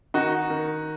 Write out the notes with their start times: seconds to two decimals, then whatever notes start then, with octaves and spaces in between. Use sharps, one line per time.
0.14 D#3 D#4 F#4
0.50 D#3